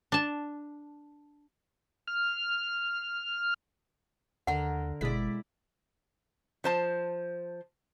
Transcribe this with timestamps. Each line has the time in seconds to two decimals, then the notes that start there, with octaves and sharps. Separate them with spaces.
0.12 D4 A5
2.08 F6
4.47 D#2 D3 A#4 F#5
5.01 G1 B2 G#3 E4 D5 B6
6.64 F3 C5 A5